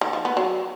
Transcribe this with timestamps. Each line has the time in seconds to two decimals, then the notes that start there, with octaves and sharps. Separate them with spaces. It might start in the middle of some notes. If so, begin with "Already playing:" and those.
0.01 D#3
0.13 F3
0.25 B3
0.37 F#3